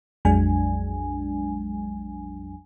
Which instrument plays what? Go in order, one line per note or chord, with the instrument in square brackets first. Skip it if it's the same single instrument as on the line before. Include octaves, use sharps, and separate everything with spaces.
[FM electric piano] A#1 F2 F#3 G#3 D4 G#5